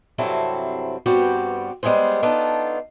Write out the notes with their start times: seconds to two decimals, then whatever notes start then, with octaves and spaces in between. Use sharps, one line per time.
0.18 G2 C3 F#3 C4 E4 A4
1.06 G2 G3 B3 C4 F#4 G4
1.83 G3 G#3 B3 G#4 C5
2.22 B3 D4 D#4 F4 A4